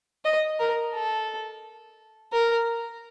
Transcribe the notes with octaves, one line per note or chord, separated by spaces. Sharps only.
D#5
A#4
A4
A#4